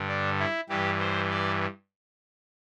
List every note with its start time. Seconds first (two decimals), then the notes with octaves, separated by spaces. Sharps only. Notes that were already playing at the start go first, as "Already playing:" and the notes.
Already playing: G2 D3
0.08 D4
0.39 E4
0.69 G2 E3 G4
1.00 C5
1.30 D5